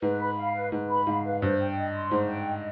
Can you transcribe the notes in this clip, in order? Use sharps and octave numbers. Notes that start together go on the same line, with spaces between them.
G#2 B4
B5
F5
B4
G#2 B4
B5
G#2 F5
B4
G2 C5
G5
D#5
C6
G#2 C5
G5
D#5